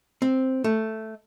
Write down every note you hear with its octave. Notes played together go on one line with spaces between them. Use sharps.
C4
A3